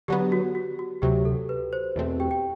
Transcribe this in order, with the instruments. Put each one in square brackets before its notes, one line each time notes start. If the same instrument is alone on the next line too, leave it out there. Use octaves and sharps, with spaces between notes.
[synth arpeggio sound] D3 F#3 B3 [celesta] G4
[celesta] F#4
F#4
F#4
[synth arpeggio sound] D2 C3 F#3 [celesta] G4
[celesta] A4
B4
C5
[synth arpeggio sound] E2 B2 A3 C4
[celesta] G4 G5
G5